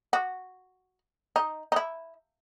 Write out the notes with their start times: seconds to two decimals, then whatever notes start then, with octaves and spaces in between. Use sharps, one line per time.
0.13 F#4
1.36 D#4
1.72 D#4 E4